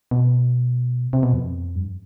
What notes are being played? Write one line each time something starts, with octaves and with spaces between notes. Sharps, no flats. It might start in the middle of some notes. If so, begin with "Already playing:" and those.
B2
C3
B2
F2
G2